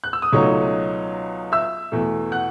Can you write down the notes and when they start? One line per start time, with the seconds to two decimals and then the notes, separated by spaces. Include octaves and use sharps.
0.04 F#6
0.13 E6
0.22 D#6
0.33 C#2 B2 F#3 A3 D#4 C#5 C#6
1.52 E5 E6
1.92 E2 B2 A3
2.32 F#5 F#6